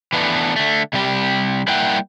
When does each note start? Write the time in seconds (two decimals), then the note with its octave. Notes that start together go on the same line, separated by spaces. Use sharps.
0.13 E3 A3 B3 D4
0.56 D3 A3
0.93 C3 G3 G4
1.68 G3 A#3 E4 F#5 G5